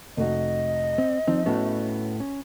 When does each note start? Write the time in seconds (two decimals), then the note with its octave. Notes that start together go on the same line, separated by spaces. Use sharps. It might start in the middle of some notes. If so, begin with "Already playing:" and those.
0.17 F1 F#4 D#5
0.98 C4
1.27 F3 C4 D#4
1.46 A2 A3 B3 C#4 F#4
2.20 C#4